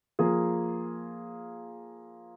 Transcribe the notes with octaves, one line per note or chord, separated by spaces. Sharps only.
F3 A#3 F4 G#4